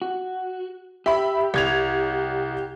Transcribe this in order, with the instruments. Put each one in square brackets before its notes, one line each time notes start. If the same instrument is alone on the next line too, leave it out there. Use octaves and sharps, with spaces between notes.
[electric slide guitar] F#4
[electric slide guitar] G4 [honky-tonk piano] E5 B5
[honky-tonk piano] C2 G#6 F7